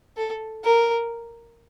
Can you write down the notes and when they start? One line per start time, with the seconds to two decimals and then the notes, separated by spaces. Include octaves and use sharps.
0.17 A4
0.64 A#4